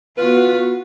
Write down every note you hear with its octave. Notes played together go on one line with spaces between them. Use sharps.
B3 F4 F#4 B4